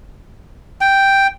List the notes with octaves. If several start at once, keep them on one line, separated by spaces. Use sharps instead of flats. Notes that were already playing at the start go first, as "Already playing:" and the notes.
G5